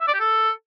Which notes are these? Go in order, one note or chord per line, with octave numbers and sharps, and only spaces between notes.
E5
D5
G4
A4